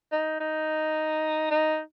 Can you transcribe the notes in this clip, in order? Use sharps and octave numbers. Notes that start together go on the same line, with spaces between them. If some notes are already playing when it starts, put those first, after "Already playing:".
D#4
D#4
D#4